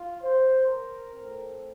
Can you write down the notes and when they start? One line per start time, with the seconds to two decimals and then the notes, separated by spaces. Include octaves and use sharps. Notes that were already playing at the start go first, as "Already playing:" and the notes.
Already playing: F4
0.23 C5
0.67 A#4
1.13 A2 A3 C4